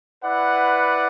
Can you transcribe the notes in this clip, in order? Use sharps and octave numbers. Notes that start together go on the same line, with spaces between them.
E4 B4 D5 F#5